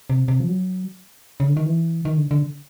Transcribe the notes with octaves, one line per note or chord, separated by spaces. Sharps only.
C3
C3
F3
F#3
C#3
D3
D#3
E3
D#3
D3
D3